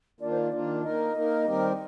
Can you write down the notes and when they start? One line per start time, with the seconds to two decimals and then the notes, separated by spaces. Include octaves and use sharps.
0.20 D#3 A#3 D4 F4 D5
0.31 C5
0.41 D5
0.51 D#3 A#3 D4 F4
0.83 A#3 D#4 A#4 D#5
1.14 A#3 D#4 A#4
1.45 D#3 G3 C4 G4 A#4